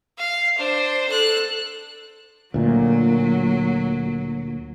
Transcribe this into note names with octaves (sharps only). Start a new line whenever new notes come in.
F5
D4 C5
A4 F#6
D2 A#2 F#3